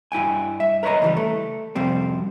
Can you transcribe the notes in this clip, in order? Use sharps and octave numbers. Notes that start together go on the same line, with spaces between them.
G2 E4 G5 G#5
E5
A#4 B4 C#5 D#5 A#5
C#2 E3 G3
A3
C2 F2 C3 G3 C4